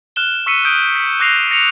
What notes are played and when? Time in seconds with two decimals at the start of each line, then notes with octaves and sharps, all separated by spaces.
0.16 F6 F#6 E7 G7
0.46 C#6 E6 B6 C#7 D#7
0.65 D#6 G6 D7
0.96 B6
1.20 D6 F#6 G6 A#6 C7 F7
1.51 A#6 C#7 F7